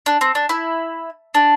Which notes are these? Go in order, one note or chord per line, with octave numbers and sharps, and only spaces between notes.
D4
C4
D4
E4
D4